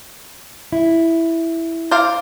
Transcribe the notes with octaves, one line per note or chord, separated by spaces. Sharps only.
E4
C5 D5 F5